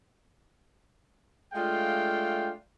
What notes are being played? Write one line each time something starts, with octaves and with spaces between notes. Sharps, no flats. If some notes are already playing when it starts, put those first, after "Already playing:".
G#3 A3 D4 F4 F5 G5